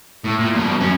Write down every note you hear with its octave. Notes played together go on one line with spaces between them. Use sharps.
A2
A#2
G2 B2
F#2 C#4